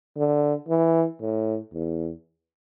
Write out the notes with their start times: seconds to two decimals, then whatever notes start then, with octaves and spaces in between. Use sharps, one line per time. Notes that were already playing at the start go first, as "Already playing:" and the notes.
0.17 D3
0.68 E3
1.21 A2
1.73 E2